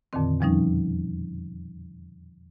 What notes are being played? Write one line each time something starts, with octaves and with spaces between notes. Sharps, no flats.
F2 A#2 D3 D#3 C4
E2 B2 F3 G3 C#4 D#4